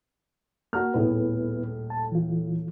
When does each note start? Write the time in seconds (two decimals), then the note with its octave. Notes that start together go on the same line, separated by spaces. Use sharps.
0.73 A#3 F#4 A#5 F6
0.94 D#1 A2 B3 E4 G#4 B4
1.90 A5
2.12 E3 F4